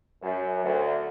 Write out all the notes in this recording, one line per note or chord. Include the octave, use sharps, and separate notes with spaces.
F#2
D2